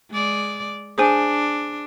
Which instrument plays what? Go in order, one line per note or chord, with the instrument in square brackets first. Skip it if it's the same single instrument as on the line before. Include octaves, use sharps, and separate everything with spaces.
[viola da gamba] G#3 D5
[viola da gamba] D4 [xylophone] G#4 C5 G#5